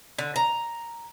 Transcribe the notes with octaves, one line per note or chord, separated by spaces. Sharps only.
D3
A#5